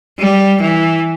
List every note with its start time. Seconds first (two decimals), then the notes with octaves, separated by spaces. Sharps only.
0.19 G3
0.62 E3